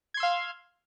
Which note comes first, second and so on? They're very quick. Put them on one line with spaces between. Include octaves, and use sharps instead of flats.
G#6 C6 E6 F5